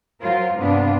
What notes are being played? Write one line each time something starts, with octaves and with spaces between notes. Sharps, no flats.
F#3 F4 A#4 C5
G2 C3 B3 D4 F4